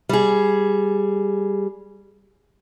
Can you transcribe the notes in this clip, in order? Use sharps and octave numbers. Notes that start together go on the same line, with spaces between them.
G3 G#4